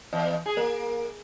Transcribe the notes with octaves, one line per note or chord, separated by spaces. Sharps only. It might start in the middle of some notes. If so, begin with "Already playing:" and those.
E2
G#4
A#3